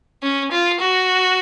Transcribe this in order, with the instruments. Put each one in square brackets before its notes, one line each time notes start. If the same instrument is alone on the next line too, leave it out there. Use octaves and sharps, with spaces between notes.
[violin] C#4
F4
F#4